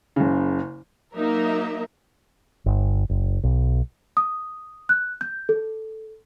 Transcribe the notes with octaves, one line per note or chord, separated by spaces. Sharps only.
F#1 C#3
F#3 A#3 D#4 A#4 E5
G1
F#1
B1
D#6
F#6
G6
A4